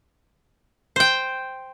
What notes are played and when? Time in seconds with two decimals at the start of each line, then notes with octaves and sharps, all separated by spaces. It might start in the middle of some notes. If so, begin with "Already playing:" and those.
0.96 C5 G5